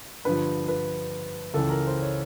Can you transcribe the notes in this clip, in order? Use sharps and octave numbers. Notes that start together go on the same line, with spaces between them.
G2 D3 F3 B4
B4
C#2 C#3 E3 A4
A#4
C5
C#5